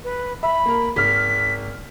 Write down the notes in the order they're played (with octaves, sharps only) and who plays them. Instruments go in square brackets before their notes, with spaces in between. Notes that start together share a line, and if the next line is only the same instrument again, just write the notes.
[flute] B4
[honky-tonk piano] E5 [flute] B5
[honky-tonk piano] A#3 A#4
[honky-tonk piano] G#1 F6 [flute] B6